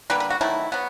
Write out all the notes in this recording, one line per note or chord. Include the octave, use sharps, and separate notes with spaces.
D3 G3 A#3 B4
B4
F#4
D#3 F#3 A3 E4
F#3 B3